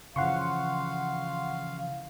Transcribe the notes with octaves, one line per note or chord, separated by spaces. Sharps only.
C#3 E3 F3 F5 F#5 C6 C#6